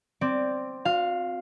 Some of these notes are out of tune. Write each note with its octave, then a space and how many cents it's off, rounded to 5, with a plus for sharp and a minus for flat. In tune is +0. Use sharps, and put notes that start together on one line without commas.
C4 +0 D5 +0
F#4 -45 F5 +0